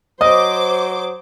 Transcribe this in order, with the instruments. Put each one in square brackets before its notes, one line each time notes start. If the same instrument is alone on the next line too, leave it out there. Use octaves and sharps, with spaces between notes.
[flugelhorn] F#3 [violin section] C5 D6 [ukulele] D#5 [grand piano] D#6